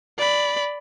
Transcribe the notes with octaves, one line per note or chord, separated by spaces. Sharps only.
D5 B5